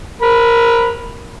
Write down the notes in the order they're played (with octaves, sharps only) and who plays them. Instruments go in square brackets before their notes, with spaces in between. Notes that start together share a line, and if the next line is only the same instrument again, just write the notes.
[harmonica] A#4 B5